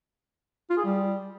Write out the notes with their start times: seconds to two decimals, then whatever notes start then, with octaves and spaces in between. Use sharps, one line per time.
0.70 F4
0.77 G#4
0.84 G3